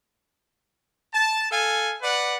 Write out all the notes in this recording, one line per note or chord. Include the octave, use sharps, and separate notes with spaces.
A5
A4 F5 G#5
B4 D5 F#5